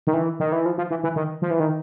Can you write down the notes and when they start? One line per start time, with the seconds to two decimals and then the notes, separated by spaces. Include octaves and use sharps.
0.07 D#3
0.14 E3
0.40 D#3
0.52 E3
0.66 F3
0.78 F3
0.90 E3
1.03 E3
1.16 D#3
1.42 F3
1.51 E3
1.60 D#3